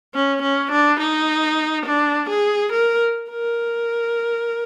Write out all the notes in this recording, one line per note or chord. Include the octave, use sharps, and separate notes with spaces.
C#4
C#4
D4
D#4
D4
G#4
A#4
A#4